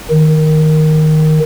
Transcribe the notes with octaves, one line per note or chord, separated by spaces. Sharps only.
D#3